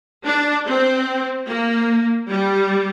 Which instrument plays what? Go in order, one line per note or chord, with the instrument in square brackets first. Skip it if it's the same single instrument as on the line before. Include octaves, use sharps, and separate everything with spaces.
[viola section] D4
C4
A#3
G3